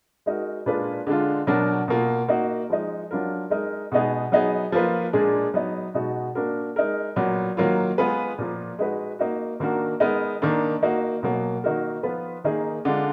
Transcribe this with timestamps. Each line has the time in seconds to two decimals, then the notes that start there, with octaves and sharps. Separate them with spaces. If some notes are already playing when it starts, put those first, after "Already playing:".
0.26 G#3 D#4 F#4 A#4
0.66 A#2 G#3 D4 F4 B4
1.07 D3 G#3 D4 F4
1.47 B2 F#3 D4 F#4 A#4
1.88 B2 A#3 F4
2.28 A#3 D#4 F#4
2.70 F3 G#3 D#4
3.11 F#3 D4 F4 A#4
3.50 G#3 D#4 A#4
3.92 B2 G#3 B3 D#4 G#4
4.32 F#3 B3 D#4 G#4
4.72 F3 A#3 F4 B4
5.13 A#2 G#3 D4 G#4
5.54 F#3 B3 D#4
5.94 B2 G#3 B3 D#4 F#4
6.35 A#3 D4 F#4 A#4
6.76 G#3 D#4 A#4
7.16 A#2 F#3 B3
7.57 D#3 F#3 A#3 F4
7.98 G#3 B3 F4 G#4 B4
8.38 A#2 F3 A#3
8.79 G#3 D#4 F#4 B4
9.19 A#3 D#4 F#4
9.60 D#3 A#3 D4 F#4 A#4
10.00 G#3 B3 D#4 A#4
10.42 D#3 A#3 D4
10.83 A#3 D#4 F#4
11.23 B2 F#3 A#3
11.64 D#3 A#3 D#4 F#4 A#4
12.03 F3 B3 F4 B4
12.44 D#3 A#3 D#4 G#4
12.85 D3 G#3 D4 F4